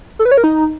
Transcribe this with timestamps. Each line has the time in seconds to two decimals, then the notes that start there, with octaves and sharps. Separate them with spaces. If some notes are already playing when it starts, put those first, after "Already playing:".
0.19 A4
0.25 B4
0.31 C#5
0.38 A#4
0.44 D#4